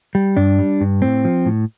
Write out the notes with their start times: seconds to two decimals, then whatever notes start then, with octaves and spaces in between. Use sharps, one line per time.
0.15 G3
0.37 G2 D4
0.59 G3
0.81 G2
1.02 A2 C4
1.25 F3
1.46 A2